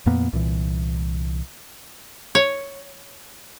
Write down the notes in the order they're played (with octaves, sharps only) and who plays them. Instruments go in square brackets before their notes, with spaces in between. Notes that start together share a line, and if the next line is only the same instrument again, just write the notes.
[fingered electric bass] F2 A#2 A#3 B3
C2 A#2 E3
[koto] C#5